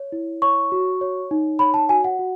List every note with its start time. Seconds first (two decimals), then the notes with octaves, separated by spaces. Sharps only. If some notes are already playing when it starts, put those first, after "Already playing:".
Already playing: C#5
0.12 E4
0.42 C#5 C#6
0.72 F#4
1.01 C#5
1.31 D#4
1.59 C#5 B5
1.74 A5
1.89 F#4 G#5
2.04 F#5
2.19 F#4